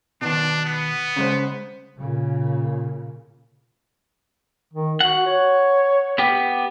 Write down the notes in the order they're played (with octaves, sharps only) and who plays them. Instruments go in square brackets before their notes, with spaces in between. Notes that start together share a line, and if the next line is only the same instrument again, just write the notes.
[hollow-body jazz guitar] B2 D#3 [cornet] D4
[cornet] B3
[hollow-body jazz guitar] C#3 G#3 C5
[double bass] A#2 C#3
[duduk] D#3
[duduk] F#4 [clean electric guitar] F#5
[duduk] C#5
[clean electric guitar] B3 G4